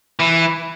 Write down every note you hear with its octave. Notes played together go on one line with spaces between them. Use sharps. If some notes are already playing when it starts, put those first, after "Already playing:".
E3